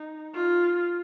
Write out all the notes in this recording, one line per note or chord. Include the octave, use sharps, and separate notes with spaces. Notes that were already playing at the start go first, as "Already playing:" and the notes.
Already playing: D#4
F4